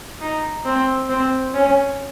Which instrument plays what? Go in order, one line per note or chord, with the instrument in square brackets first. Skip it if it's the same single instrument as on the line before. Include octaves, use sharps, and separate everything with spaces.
[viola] D#4
C4
C4
C#4